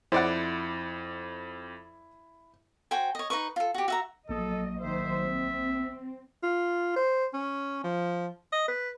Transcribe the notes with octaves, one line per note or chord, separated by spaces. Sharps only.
F2 E4 C5 D5 F#5
F#4 C5 G5 G#5
C#5 D#5
D#4 B4 C#6
F4 A4
F#4 G4
F#4 E5 A#5
A#1 F#3 A#3 A4 D#5 D#6
D#3 F#3 C5 E5
C4
F4
C5
C#4
F3
D#5
B4